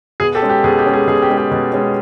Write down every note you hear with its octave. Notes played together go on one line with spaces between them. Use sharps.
B2 G#4
G4 A4
G#3 C#4
G4
B2 G#4
G4
G#3 C#4
G#4
B2 G#4
G4
G#3 C#4
G4
B2
G#3 C#4